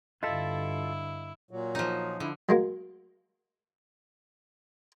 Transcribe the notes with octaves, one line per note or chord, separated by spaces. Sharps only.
G2 D3 E4 F4 A4 D#5 F5 B6
A#2 F#3
F3 D#4
D3 E4
F#3 G#3 A#3